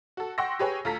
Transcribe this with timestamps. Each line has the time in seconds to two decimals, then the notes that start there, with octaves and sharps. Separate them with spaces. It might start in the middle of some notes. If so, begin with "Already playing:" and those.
0.17 F#4 A4
0.38 F#5 G5 C6 C#6 E6 A#6
0.59 G4 G#4 B4 C#5 G5 G#5
0.85 D2 F4 A4 A#5 B6